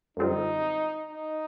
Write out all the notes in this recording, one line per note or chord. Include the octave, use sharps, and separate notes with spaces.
F#2 D3 G3 C4 D#4 F4
D#4